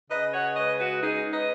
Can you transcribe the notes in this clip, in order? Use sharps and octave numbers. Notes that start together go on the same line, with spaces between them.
C#3 B4 D#5
C#5 F#5
G#3 B4 D#5
F#4 B4
C#4 D#4 G#4
B4 D#5